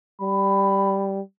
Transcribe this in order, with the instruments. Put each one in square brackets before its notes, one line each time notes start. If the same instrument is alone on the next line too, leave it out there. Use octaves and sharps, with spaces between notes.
[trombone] G3 [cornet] B5